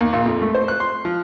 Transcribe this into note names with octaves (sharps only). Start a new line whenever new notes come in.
D#2
A#1
F2
A3
C5
F#6
C6
F3